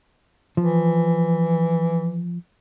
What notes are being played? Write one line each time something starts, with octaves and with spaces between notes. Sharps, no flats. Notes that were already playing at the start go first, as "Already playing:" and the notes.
E3 F3